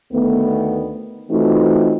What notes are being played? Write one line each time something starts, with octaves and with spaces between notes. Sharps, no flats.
D2 D#3 A3 B3
E3 A3 C4 D#4 F4 F#4